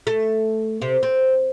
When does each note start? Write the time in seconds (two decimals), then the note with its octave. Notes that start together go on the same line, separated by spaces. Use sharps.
0.07 A3
0.82 C3
1.03 C4